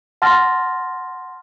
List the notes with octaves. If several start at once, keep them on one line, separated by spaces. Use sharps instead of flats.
F#5 A5 C6 F6 A6 A#6